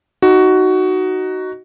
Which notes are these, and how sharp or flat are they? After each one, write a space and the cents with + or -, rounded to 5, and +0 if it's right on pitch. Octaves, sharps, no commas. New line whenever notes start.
D#4 +0 F#4 +10